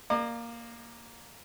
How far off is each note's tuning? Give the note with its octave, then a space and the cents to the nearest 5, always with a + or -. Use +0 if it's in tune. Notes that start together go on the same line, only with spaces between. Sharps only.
A#3 +0 D5 +40